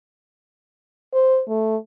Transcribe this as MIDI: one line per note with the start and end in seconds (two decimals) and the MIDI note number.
1.13 1.42 72
1.48 1.76 57